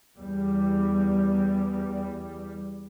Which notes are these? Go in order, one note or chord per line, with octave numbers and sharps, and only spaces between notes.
E2 G3